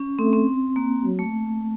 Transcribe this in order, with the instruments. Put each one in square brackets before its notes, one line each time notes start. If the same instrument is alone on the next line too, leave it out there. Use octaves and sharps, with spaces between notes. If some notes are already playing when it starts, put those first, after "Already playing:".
Already playing: [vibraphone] C#4
[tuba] A3 [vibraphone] C4
[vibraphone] C4
A#3
[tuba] F#3
[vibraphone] A3